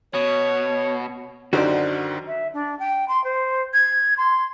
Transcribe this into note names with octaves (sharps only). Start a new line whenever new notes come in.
B2 C#5
F#2 D3 D#3 F#4 C5 D5
E5
D4
G5
C6
C5
G#6
C6